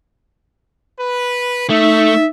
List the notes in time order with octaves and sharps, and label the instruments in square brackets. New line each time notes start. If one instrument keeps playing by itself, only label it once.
[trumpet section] B4
[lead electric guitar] A3 [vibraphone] D#4 [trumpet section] E5